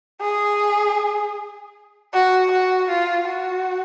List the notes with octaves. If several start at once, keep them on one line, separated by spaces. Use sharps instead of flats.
G#4
F#4
F#4
F4
F#4